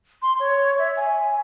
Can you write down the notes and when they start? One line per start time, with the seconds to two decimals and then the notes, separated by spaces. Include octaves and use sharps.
0.22 C6
0.40 C#5
0.79 E5
0.97 G#5